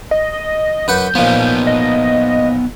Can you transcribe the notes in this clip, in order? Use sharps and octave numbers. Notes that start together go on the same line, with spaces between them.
D#5
F#2 B4 F#5 G6
A#2 F3 B3 D#4
D#5